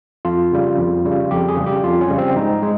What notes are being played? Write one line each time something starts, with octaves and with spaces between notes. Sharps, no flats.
F2 F4
C#3 G3
F2
C#3 G3
F2 G4
G#4
C#3 G3
G4
F2 F4
C#4
C#3 G3
C4
G#2 D#4
G#3